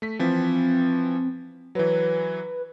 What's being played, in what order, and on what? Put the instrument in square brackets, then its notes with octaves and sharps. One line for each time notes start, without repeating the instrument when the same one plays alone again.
[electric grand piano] A3 B6
[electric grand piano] E3 F3 [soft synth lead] C4
[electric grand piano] E3 F#3 [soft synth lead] B4